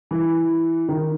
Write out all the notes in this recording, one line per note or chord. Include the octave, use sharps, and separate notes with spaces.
E3
D#3